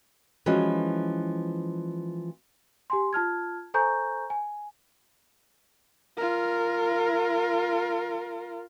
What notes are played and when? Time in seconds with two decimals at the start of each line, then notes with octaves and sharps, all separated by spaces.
0.46 E3 F3 G#3 C#4 F#4
2.90 G4 G#5 C6
3.13 F4 A5 F6 G#6
3.74 A4 C5 G#5 A#5 C#6 G6
4.30 G#5
6.17 F4 A#4